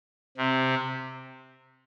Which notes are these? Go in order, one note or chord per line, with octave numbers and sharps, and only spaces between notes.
C3